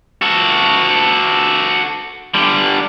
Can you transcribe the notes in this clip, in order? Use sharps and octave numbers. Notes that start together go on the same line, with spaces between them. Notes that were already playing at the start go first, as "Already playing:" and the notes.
F#4 A4
D3 G3